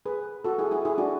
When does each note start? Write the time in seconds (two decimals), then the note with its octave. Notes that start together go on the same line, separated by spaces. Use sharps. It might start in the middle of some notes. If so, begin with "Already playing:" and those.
0.06 G#4 B4
0.44 F#4 A4
0.58 E4 G#4
0.71 E4 G#4
0.85 E4 G#4
0.98 D4 F#4